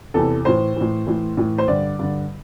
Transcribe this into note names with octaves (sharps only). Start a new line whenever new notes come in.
E2 C3 E3 A4
A2 E3 C5
A2 E3
A2 E3
A2 E3
C5
G2 D3 D5
G2 D3